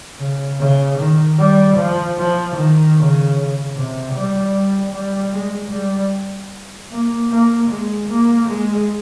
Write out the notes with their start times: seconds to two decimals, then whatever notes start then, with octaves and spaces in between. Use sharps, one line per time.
0.20 C#3
0.59 C#3
0.99 D#3
1.39 G3
1.77 F3
2.18 F3
2.56 D#3
2.97 C#3
3.76 C3
4.14 G3
4.54 G3
4.93 G3
5.33 G#3
5.72 G3
6.91 A#3
7.31 A#3
7.70 G#3
8.09 A#3
8.48 G#3